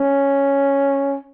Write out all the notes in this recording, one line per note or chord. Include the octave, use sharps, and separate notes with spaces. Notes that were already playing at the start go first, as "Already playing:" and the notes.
Already playing: C#4